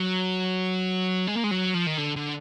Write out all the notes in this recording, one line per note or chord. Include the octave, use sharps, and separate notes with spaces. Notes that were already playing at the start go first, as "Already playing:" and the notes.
Already playing: F#3
G#3
A#3
G#3
F#3
F3
D#3
D3
D3